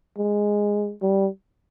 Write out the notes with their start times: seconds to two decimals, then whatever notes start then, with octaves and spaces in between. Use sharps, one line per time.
0.18 G#3
1.02 G3